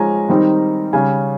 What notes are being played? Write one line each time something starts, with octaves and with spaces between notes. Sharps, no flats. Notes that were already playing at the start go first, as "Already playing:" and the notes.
Already playing: F3 G#3 C#4 G#5 A#5
D#3 G3 C4 D#4
C#3 G3 C#4 G#5